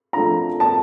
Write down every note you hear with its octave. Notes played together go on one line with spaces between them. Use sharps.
F3 A3 D4 F4 A#5
A5